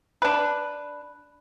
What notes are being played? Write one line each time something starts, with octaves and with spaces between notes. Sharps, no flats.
D4 B4